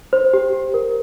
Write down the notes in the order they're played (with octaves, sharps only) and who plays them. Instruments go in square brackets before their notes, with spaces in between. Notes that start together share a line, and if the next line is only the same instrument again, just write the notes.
[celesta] C5
G4
G4
A#4